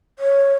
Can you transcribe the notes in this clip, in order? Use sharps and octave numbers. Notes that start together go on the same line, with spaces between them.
C#5